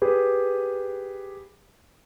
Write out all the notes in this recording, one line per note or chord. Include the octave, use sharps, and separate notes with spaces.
G4 G#4 B4